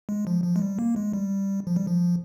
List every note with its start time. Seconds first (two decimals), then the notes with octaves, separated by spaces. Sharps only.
0.09 G#3
0.27 F3
0.44 F3
0.56 G#3
0.62 G3
0.79 A#3
0.96 G#3
1.13 G3
1.67 F3
1.76 G3
1.87 F3